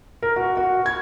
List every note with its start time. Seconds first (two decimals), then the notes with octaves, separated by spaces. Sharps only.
0.22 A#4
0.36 F#4
0.57 F#4
0.86 G#6